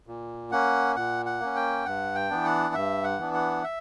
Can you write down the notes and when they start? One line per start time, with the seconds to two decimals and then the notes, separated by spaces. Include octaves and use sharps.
0.07 A#2
0.51 A#3 C#4 F#5
0.96 A#2 F#5
1.26 F#5
1.40 A#3 C#4
1.56 G5
1.85 G2 F#5
2.15 G5
2.30 E3 B3 D4
2.45 F#5
2.74 G2 E5
3.04 F#5
3.19 E3 B3 D4
3.34 F#5
3.63 E5